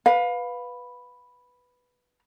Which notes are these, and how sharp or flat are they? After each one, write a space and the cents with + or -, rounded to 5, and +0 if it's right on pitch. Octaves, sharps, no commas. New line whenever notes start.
B4 +0 F5 +25